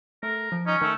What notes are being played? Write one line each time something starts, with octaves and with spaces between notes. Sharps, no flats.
A3 A#4
F3
C#4 D#4
D#3 A3